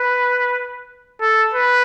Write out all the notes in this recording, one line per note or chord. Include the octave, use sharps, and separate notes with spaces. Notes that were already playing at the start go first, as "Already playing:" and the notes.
Already playing: B4
A4
B4